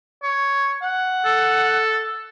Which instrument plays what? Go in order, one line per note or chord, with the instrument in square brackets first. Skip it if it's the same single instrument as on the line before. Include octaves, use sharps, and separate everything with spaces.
[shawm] C#5
F#5
[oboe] A4